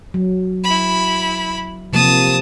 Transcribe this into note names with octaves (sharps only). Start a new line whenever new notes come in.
F#3
E4 B5
C3 F3 A#3 A5 D#6